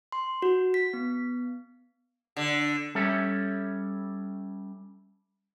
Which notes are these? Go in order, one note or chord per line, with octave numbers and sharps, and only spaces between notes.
C6
F#4
B6
B3
D3
G3 C#4 A4 C#5 E5